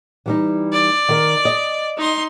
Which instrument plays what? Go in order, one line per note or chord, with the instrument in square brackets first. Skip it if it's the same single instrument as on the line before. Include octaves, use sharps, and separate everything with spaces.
[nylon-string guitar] E3 G3 D#4
[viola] D5
[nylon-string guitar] D#3 A#4
D#5
[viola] D#4 C6